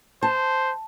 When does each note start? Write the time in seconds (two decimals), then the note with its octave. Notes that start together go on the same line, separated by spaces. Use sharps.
0.23 C5 A5